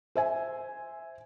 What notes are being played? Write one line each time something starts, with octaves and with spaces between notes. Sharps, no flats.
C5 E5 G#5